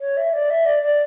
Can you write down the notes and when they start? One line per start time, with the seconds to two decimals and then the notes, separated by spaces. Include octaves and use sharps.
0.01 C#5
0.17 E5
0.33 D5
0.50 E5
0.65 D5
0.83 D5